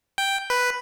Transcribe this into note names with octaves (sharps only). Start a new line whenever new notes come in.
G5
B4